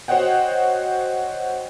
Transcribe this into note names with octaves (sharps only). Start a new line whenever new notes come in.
F#4 C5 C#5 D#5 F#5 G5